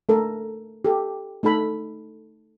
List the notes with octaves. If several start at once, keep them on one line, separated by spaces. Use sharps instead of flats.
A3 A4 A#4
G4 A4
A3 D#4 A4 B5